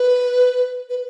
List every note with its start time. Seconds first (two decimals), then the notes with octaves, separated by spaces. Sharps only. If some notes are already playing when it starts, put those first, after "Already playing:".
Already playing: B4
0.89 B4